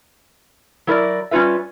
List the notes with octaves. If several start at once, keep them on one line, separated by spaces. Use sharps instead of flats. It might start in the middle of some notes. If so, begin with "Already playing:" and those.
F#3 E4 A#4 B4 D5
G3 C#4 D4 F4 B4 E5